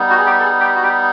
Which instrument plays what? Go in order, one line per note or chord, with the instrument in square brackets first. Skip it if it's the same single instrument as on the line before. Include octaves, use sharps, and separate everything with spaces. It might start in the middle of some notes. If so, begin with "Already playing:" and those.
Already playing: [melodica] G3 B3 D#4
F#4
G#4
G4
A4
G#4
G4
F#4
G4